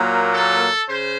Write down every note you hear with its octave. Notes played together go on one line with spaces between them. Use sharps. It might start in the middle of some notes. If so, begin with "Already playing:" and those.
Already playing: A#2 F#3 A#3
A4
C#3 C5